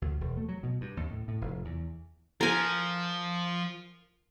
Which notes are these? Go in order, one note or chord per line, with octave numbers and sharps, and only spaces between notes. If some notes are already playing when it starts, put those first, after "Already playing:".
D2
E1
A3
F#3
B2
G2
D#2
A2
A2
F1
E2
F3 A#4 G#5